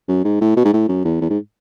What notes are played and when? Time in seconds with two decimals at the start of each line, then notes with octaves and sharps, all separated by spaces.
0.08 F#2
0.25 G#2
0.41 A2
0.57 B2
0.65 G#2
0.73 A2
0.89 F#2
1.05 E2
1.21 E2
1.30 G#2